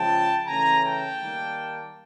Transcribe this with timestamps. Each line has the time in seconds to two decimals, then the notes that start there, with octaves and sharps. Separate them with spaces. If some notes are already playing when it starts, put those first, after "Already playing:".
Already playing: C#3 F3 G#3 G5 A5
0.46 C#3 E3 A3 C#4 G#5 A#5
0.83 G5 A5
1.21 D#3 G3 A#3